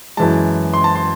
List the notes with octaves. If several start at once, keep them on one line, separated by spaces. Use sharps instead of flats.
F#2 E3 G#3 A5
C6
A5
C6